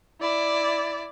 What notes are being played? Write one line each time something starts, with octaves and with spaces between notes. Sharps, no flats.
E4 D5